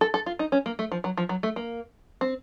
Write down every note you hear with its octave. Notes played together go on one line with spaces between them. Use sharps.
A4
A4
F4
D#4
C#4
A#3
A3
F3
F#3
F3
F#3
A3
A#3
C4